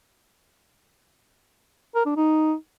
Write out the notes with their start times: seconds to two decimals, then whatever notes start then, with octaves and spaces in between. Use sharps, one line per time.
1.95 A#4
2.06 D4
2.16 D#4